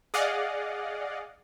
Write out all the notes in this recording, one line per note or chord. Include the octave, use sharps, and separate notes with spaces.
G#4 D5 D#5 F5 F#5